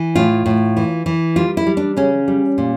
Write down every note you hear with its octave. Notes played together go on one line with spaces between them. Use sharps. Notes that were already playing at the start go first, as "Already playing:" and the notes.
Already playing: E3
A2 F4
A2
E3
E3
G3 F4
E4
G3
D4
C#3 C#4
G3
A#2